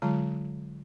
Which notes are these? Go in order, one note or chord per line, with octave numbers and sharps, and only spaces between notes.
D3 F#3 G#3 F4 A#5